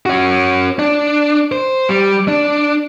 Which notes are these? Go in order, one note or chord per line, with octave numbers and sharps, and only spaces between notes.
C#4 F#4
D4
C5
G3
D4